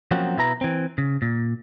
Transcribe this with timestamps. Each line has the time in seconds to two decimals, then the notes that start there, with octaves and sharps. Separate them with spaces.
0.11 F3 F#3 A#3 C4 C#4 F#4
0.38 B2 E4 B4 A#5
0.61 E3 C4
0.98 C#3
1.22 A#2